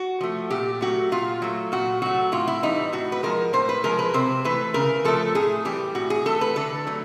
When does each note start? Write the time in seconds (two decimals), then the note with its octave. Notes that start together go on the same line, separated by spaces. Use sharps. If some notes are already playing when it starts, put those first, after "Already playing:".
Already playing: F#4
0.21 F3 A3
0.50 A#2 G4
0.81 F#3 A3 F#4
1.12 A#2 F4
1.42 F#3 A3
1.72 A#2 F#4
2.02 F#3 A3 F#4
2.32 A2 F4
2.48 E4
2.63 E3 G3 D#4
2.93 A2 F#4
3.12 B4
3.23 F3 G#3 A#4
3.53 A2 C5
3.69 B4
3.84 F3 G#3 A#4
3.99 B4
4.14 C3 C5
4.44 E3 A3 B4
4.74 C#3 A#4
5.04 F3 A3 A4
5.35 A2 G#4
5.65 E3 G3 G4
5.95 A2 F#4
6.10 G#4
6.26 E3 A3 A4
6.41 B4
6.56 D3 A4
6.87 F#3 A3